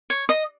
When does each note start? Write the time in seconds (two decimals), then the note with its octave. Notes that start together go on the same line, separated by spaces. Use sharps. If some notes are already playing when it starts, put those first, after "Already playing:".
0.10 C#5
0.29 D#5